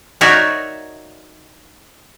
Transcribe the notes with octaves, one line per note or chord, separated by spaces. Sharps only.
D#4 F#4 A#4 C#5 D5 E5